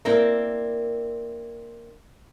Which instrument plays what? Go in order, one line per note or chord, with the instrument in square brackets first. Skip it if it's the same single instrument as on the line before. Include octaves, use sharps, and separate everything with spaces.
[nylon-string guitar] A#3 D4 [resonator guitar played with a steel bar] C4 E4 A#4